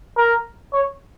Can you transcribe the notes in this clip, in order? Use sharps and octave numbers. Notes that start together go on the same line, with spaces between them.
A#4
C#5